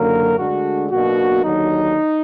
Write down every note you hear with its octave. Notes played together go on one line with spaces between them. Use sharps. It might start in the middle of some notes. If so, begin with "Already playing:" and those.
Already playing: F#1 F#2 D3 F#3 A#3 A#4
D2 D3 G#3 D4 F#4
B1 B2 A#3 D4 F#4
D#2 D3 F#3 D#4